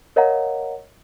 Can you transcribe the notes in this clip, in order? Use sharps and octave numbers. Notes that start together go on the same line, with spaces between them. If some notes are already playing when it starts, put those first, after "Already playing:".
A#4 C#5 D#5 F5 F#5 A#5